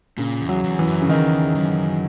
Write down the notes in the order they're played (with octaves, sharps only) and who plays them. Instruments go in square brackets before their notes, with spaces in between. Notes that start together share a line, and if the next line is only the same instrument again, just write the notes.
[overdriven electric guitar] A#2 [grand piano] C#3
[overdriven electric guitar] E2
[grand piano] F#3
[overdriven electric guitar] E2
[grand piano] E3
[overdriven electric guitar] F#2
[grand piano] C#3
[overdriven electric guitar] E2 [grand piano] D#3
[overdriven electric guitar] F#2